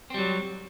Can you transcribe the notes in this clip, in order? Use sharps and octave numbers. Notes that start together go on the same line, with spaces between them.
F#3 G3 C4